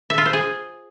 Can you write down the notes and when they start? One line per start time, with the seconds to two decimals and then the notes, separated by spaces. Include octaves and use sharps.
0.10 E5
0.18 F4
0.26 C5
0.33 G#4